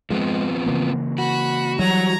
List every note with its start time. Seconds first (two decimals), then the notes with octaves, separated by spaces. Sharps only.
0.10 F3 G#3 B3 C4
0.66 C#3 E3 A#3
1.18 F#4 B5
1.79 E3 F#3 G3 A#5 G#6